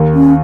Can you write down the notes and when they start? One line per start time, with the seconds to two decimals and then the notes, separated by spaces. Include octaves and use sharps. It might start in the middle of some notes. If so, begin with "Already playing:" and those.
Already playing: D#2 D#3
0.14 C#4